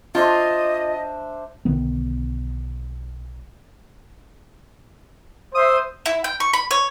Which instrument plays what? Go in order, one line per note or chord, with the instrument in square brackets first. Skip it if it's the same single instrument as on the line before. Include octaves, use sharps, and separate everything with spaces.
[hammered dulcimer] D4 C5 E5 [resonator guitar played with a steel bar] F4 [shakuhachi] D#5
[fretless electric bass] B1 D3 D#3 B3
[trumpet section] C5 E5 [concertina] D#6
[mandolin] E4
G5
C#6
B5
C#5